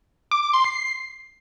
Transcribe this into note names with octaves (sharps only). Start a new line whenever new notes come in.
D6
D6
C6
C7